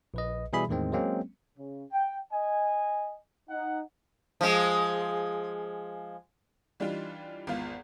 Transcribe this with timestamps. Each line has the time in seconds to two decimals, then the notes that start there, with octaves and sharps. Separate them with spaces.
0.14 A#1 B4 D#5
0.53 B2 E3 G3 G#4 E5 B5
0.69 E2 A2 D#3 G#3 C4
0.92 F#3 G#3 A#3 C4 C#4
1.57 C#3
1.91 G5
2.31 D#5 G#5
3.50 D#4 F#5
4.41 F3 G#3
6.80 E3 G3 D4 D#4 F4
7.47 G#1 E2 B3 F4 F5